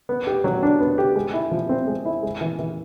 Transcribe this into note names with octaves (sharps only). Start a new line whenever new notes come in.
B3
G4
F#3
D4
B3
G4
G#3
E4
F3
C4
G#3
E4
G#3
E3
E3